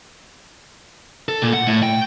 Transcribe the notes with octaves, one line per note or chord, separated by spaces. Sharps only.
A4
A#2
F#5
A2
G5